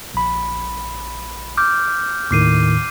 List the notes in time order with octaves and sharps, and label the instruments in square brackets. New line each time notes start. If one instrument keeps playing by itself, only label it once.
[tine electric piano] A#1 B5
[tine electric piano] D6 [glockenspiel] F6 G6
[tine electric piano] D#2 A2 D#3 [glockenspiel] D6 C7 D#7